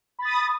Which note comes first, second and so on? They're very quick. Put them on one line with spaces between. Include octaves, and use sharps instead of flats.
B5 A6 D#6